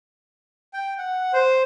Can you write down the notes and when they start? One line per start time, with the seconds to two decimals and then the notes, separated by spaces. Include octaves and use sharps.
0.73 G5
0.98 F#5
1.33 C5